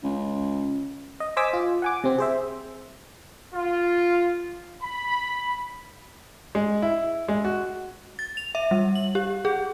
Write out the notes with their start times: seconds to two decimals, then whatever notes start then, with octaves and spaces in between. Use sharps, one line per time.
0.04 C#2
1.20 D#5
1.37 C5 D#5 G#5 D6 E6 B6
1.53 F4
1.82 F#5 G#5 D6
2.04 C3 C4
2.18 G#4 C5 E5
3.53 F4
4.82 B5
6.55 G#3
6.82 E4
7.28 G#3
7.45 F#4
8.19 A6
8.37 F7
8.55 E5
8.71 G3
8.95 F#7
9.15 G4
9.45 G#4